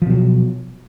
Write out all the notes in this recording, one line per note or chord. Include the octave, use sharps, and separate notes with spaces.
B2 F3 F#3